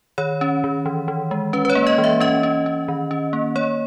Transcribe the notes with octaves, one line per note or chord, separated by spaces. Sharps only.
D#3 C#5
C#4
D#3
E3
E3
G#3
C#4 B4
B4
C#5
A#3
D#5
E3
E5
C#4 D#5
C#4
C#4
D#3
C#4
A#3
A#3 C#5